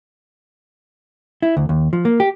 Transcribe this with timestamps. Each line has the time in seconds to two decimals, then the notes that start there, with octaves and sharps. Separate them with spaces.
1.42 E4
1.57 D2
1.69 D#2
1.93 F3
2.05 A#3
2.20 G4